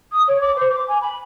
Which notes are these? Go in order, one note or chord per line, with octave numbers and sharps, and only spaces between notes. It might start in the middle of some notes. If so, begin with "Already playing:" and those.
D#6
C#5
D6
C5
D6
G#5
B5